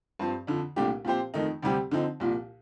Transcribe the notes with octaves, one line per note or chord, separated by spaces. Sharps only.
G2 F3 C4
F2 D3 F3
C2 A#2 A3 D4 G4
A#2 F3 C4 G4 C5
F2 D#3 A3 D#4
D2 C3 G3 C4 G4
D3 F3 C4 D#4
C2 A#2 F3